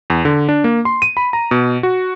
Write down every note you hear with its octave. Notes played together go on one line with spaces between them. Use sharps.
E2
D3
D4
A#3
C6
D#7
B5
A#5
B2
F#4